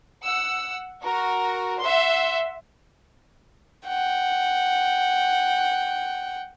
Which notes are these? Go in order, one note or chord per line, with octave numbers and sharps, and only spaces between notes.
F#5 E6
F#4 A#4
E5 F#5 C6
F#5 G5